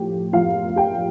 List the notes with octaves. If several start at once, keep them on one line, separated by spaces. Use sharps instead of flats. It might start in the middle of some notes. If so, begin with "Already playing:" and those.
Already playing: A2 F3 G4
A2 F3 F4 F5
G4 G5